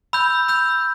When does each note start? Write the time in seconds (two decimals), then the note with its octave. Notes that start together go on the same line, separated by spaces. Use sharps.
0.13 B5 E6 G6
0.48 B5 E6 G6